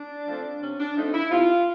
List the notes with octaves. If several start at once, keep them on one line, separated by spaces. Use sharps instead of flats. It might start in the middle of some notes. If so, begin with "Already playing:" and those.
Already playing: D4
F3 A3 C4
C3 C#4
D4
F3 A3 C4 D#4
E4
C3 F4